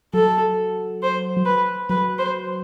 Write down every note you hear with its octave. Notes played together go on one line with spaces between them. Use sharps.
F#3 A4
C5
B4
F#3 B4
C5